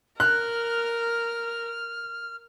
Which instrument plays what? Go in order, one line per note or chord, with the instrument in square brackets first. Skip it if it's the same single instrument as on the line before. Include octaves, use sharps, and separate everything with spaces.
[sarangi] A#4 [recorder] F6 [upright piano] F#6